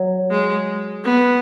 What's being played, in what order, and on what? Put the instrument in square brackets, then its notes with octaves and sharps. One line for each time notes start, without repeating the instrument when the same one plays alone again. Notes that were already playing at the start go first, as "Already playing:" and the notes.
Already playing: [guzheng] F#3
[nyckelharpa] G#3
B3